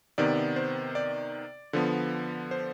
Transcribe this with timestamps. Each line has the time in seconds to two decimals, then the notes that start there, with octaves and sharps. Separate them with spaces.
0.18 C3 D#3 B3 D5
0.56 C5
0.95 D5
1.73 D3 F3 B3
2.51 C5